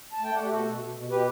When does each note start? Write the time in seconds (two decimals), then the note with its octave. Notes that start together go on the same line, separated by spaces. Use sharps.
0.13 A5
0.20 A3 G5
0.35 A3 D5 F#5
0.45 G4
0.49 B2 F#4 A4
0.65 B2
0.80 B2
0.95 B2
1.09 B2 G4 B4